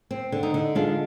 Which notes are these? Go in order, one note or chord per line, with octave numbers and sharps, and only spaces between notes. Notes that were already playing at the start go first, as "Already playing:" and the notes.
C4
D3
D#4
D3
G#3 D4 F4